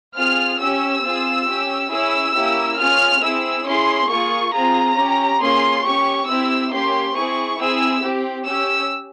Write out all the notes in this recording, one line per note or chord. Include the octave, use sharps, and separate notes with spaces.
C4 F4 G#4 F6
C#4 G4 E6
C4 F4 G#4
C#4 G4
C#4 E4 G#4 E6
A#3 C#4 E4 G4
C#4 F4 G#4 F6
C4 E4 G#4 E6
C#4 E4 G#4 C6
A#3 F4 G#4 C#6
C4 F4 G#4 A#5
C#4 G4
A#3 C#4 F4 G#4 C6
C#4 G4 C#6
C4 E4 G4 E6
A#3 C#4 G4 C6
C4 E4 G#4 C#6
C4 E4 G#4 E6
C4 G4
C#4 G4 E6